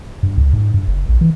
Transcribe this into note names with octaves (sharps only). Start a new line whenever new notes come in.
G2
C#2
G#2
G2
F#1
A#1
E3